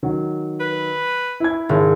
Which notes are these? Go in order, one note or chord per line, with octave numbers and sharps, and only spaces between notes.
D#3 F#3
B4
E4 G#6
G#1